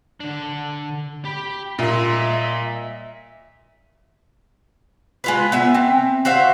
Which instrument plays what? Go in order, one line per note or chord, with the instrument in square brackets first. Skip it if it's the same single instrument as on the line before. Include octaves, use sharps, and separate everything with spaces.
[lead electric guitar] D3 D4
[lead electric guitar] G4 [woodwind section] B5
[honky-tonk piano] A#2 [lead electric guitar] D#5 C6 [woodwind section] E5
[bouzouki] G#3 F4 B4
B3 E5 G#5
C4
F#4 C5 E5 F5